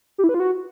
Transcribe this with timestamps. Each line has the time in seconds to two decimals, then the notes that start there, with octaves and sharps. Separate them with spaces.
0.18 G4
0.24 E4
0.29 B4
0.34 F4
0.40 F#4